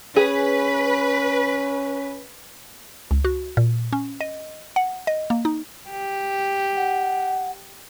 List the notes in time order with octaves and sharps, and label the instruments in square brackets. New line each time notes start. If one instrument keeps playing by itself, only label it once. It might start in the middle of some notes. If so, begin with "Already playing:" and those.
[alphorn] C#4 [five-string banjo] G#4 [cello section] B4
[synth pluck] C#2
F#4
A#2
C#4
D#5
F#5
D#5
A#3
D#4
[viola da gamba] G4
[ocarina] F#5